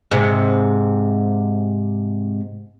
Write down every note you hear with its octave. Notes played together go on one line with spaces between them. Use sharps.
G#2 C3